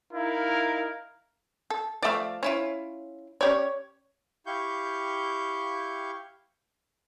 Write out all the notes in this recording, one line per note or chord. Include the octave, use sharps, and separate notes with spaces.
D#4 E4 A#4 F5
A4
F3 A3 D5 E5 F5
C#4 E4 F4 C#5
C#4 G4 C#5 D5
E4 G4 F5 C#6 G6